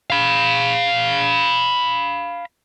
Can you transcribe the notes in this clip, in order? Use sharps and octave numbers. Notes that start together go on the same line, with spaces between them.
F5 B5